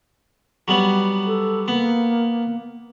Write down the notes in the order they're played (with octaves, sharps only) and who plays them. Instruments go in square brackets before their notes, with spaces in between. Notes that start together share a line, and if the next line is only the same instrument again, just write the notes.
[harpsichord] F#3 G3 B3
[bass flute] A4
[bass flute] A#3 [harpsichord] B3